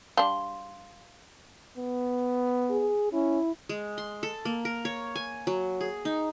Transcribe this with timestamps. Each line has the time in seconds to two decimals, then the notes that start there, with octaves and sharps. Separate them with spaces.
0.17 G3 D4 F5 C6
1.78 B3
2.70 G#4
3.13 C#4 E4
3.69 G#3
3.98 C6
4.23 A4
4.45 A#3
4.65 A#4
4.85 C#5
5.16 G#5
5.47 F#3
5.81 G#4
6.05 D#4